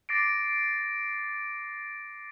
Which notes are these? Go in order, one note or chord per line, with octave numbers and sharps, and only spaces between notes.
D6 A6 A#6 C7 D7